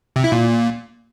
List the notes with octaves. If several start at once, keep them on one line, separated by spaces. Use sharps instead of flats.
C3
E4
A#2